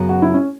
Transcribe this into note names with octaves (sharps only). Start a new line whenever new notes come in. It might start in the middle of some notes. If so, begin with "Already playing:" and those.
Already playing: F#2 C#3 F#3 B3
F#4
E4
C#4